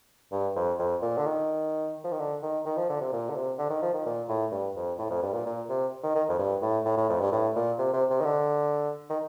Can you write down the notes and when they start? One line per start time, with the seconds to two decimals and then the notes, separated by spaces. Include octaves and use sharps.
0.32 G2
0.56 F2
0.79 F2
1.02 A#2
1.18 D3
1.26 D#3
2.04 F3
2.12 D#3
2.19 D3
2.43 D#3
2.65 D#3
2.77 F3
2.89 D3
3.01 C3
3.13 A#2
3.30 D3
3.36 C3
3.58 D3
3.70 D#3
3.82 F3
3.94 D#3
4.06 A#2
4.28 A2
4.52 G2
4.76 F2
4.98 A2
5.10 F2
5.22 G2
5.33 A#2
5.46 A#2
5.69 C3
6.03 D#3
6.15 D#3
6.29 F2
6.38 G2
6.62 A2
6.85 A2
6.97 A2
7.09 F2
7.20 G2
7.32 A2
7.55 A#2
7.78 C3
7.93 C3
8.10 C3
8.21 D#3
8.25 D3
9.10 D#3